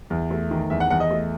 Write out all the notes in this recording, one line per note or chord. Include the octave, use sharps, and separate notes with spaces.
E2
A3
D#3
E2 E5
F#5
E2 F#5
D#5
A3